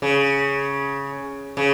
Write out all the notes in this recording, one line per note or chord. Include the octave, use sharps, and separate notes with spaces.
C#3
C#3